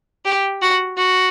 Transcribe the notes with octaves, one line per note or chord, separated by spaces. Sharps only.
G4
F#4
F#4